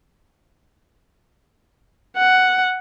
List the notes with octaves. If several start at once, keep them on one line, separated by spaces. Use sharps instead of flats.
F#5